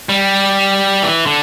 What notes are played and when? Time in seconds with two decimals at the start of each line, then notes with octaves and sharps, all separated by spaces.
0.09 G3
1.03 E3
1.26 D3